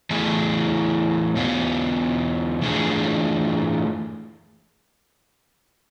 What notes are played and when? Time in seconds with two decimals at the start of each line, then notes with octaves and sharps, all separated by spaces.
0.10 E3 A3 E4 G#4
1.36 E2 B2 B3 F4
2.61 E3 A3 D4 F4 G#4